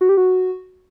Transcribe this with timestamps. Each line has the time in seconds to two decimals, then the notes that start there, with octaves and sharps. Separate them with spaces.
0.01 F#4
0.09 G4
0.17 F#4